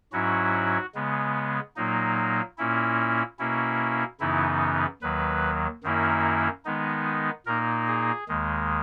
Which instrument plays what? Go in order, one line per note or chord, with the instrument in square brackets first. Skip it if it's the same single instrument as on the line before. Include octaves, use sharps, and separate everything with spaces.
[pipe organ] G#2 F#3 C#4 E4 F#4
C#3 G#3 B3
A#2 F#3 A#3 D#4
A#2 A#3 C#4 E4
B2 A#3 C#4 E4
F#2 C#3 E3 B3 D#4 E4
D#2 D#3 F#3 B4
F#2 D#3 A#3 C#4 E4
D#3 G#3 B3 D#4
A#2 A#3 D#4 A#4
G#4
D#2 D#3 G#3